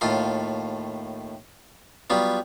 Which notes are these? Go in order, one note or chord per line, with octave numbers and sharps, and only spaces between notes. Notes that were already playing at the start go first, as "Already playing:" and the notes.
D#2 A2 F4 A4 C6
F#3 G3 B3 F4